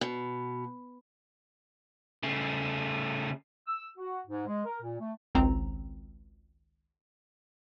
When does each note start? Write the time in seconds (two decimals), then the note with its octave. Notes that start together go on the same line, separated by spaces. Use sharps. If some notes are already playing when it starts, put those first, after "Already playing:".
0.01 B2
2.23 C#3 A3
3.67 E6
3.97 F#4
4.26 G#2
4.46 G#3
4.65 A#4
4.81 A#2
4.99 A3
5.35 G#1 C#2 C4 A#5